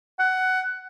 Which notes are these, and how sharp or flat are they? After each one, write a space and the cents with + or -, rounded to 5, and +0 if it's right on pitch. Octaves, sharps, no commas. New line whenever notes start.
F#5 +15